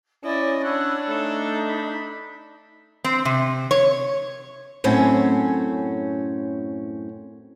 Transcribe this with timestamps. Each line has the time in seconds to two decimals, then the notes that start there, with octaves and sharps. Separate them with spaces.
0.24 C#4 E4 D5 D#5
0.63 D4 C#5 F#5 B5 E6
1.08 A3 D#4 A4
1.69 B5
3.04 C4
3.25 C3
3.71 C#5
4.84 F#2 A2 C4 C#4